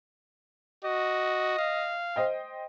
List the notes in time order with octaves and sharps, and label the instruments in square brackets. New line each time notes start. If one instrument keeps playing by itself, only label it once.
[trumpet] F#4 [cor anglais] D#5
[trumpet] F5
[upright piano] C5 D#5 G5